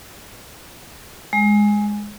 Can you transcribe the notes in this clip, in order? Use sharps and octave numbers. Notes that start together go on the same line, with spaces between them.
G#3